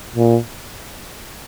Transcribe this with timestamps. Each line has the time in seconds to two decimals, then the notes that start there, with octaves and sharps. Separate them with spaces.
0.16 A#2